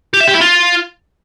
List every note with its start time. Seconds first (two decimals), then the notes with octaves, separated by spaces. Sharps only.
0.14 G4
0.21 E5
0.27 G4
0.34 E4
0.41 F4